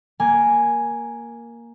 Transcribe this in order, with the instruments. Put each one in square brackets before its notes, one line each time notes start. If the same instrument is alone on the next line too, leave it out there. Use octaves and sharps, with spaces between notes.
[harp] A#3 G#5